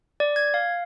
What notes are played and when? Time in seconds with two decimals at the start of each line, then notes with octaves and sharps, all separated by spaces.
0.20 D5
0.36 G#6
0.54 F5